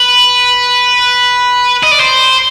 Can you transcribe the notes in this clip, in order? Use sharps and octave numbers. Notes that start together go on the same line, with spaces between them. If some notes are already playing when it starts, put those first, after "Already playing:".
Already playing: B4
D#5
D5
C5